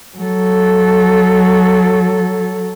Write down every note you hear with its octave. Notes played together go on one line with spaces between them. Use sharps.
F#3 A4